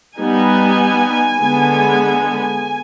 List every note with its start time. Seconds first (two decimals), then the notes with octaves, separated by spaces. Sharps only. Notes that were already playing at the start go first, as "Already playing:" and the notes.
0.19 G3 B3 D#4 G#5
1.40 D3 G#3 B3